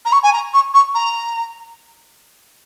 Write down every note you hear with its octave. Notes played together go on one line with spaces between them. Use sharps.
A#5
C#6
G#5
A#5
C#6
C#6
A#5